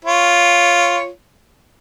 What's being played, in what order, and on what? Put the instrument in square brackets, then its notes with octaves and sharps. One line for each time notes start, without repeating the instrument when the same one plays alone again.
[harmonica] F4 C#5